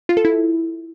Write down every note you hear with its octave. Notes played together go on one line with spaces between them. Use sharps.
F4
A4
E4